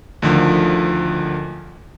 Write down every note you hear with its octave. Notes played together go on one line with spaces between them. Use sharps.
D2 D3 D#3 F3